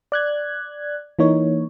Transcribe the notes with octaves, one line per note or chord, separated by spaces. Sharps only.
D5 F#6 G#6
E3 A#3 D#4 C#5